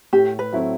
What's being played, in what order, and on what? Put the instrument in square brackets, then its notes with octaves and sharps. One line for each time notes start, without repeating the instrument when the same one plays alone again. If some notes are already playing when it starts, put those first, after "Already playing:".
[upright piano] A2 [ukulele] G4
[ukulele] B4
[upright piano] F#3 A3 C4 E4